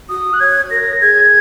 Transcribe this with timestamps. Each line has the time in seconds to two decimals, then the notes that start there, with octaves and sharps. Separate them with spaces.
0.09 F#4 D#6
0.33 F#6
0.40 C#5 G#6
0.71 A#4 A#6
1.01 G#4 G#6